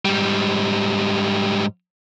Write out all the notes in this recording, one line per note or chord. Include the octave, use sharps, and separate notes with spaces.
G#2 G3